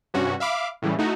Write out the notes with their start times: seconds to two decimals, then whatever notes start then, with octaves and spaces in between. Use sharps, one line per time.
0.14 G2 C3 C#4 F#4
0.40 E5 F5 B5 D6
0.82 A2 C#3 E3 G3
0.98 A3 D#4 E4 F#4